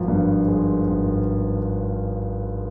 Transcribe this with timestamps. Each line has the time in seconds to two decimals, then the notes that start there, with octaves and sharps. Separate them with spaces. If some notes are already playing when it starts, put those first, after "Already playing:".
Already playing: G#1 F3
0.08 G2
0.47 G#3
0.87 G#1